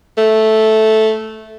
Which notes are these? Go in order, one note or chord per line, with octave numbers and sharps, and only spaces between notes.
A3